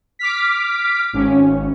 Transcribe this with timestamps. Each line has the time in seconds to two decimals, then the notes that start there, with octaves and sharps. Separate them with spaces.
0.19 D6 F6 B6
1.13 G#1 C#4